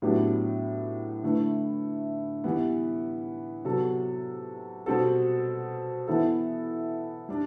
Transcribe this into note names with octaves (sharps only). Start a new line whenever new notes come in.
A2 F#3 B3 D4 G4
D3 A3 E4 B4
E3 G3 B3
C3 F#3 B3 F#4 A4
B2 G3 C4 F#4 A4
E3 B3 E4 A4
G3 D4